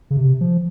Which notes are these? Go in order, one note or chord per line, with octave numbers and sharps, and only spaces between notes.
C#3
C3
F3